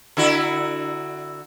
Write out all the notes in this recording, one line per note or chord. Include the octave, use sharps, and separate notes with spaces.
D3 E4 F#4